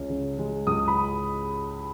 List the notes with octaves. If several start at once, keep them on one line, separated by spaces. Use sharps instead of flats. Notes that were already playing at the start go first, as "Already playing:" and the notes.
Already playing: C#2 G#3 C#4
C#3
G#3
C#2 D#6
B5